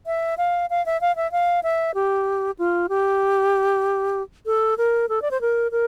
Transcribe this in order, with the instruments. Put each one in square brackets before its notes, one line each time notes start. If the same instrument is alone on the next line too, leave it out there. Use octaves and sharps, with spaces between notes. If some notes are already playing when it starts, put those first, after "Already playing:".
[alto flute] E5
F5
F5
E5
F5
E5
F5
E5
G4
F4
G4
A4
A#4
A4
D5
C5
A#4
A#4